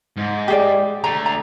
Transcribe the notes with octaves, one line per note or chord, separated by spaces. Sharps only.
G#2
G4 G#4 D5
D3 A3 A#5
A#5